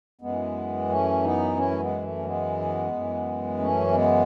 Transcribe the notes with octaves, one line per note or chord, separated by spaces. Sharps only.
F#2 E3 G#3 B3
A3 C#4
B3 D#4
C#4 E4
A3
G#3 B3
A3
C#4
G#3 B3
F#2 E3
A3 C#4
A3
G#3 B3